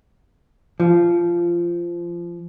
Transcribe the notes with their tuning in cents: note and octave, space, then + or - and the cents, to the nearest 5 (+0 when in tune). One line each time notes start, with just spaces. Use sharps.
F3 -20